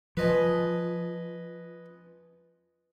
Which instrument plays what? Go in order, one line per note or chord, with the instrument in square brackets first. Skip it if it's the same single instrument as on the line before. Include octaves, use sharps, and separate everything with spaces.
[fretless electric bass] F3 [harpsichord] B4 D#5 G#5